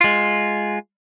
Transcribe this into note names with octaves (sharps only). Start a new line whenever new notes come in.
G#3 F4